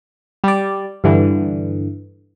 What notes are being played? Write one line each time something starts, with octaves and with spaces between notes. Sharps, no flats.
G3 D5
G2 D3 E3